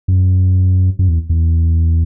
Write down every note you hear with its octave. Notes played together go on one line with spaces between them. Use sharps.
F#2
F#2
E2
E2